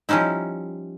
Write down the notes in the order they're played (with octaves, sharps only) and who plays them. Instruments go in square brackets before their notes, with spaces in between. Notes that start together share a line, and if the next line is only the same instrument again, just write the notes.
[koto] F3 G3 C#4 D#4 E4